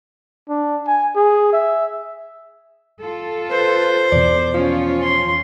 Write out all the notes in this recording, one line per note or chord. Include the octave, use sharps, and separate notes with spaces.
D4
G#5
G#4
E5
F4 A4
B4 C5
E2 B2 D5
F3 C#4 F4 C#5
C6